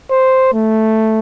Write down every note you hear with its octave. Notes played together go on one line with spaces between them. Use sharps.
C5
A3